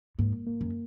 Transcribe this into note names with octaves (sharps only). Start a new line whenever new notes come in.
G#2 A#3
A#3
F#2